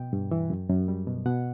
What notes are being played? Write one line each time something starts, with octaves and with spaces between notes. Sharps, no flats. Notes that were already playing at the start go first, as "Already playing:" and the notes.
Already playing: B2 G5
G2
E3
F#2
F#2
G3
B2
B2 F#5